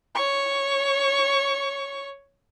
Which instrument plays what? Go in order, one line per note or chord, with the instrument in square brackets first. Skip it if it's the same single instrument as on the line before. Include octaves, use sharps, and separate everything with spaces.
[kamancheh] C#5 C#6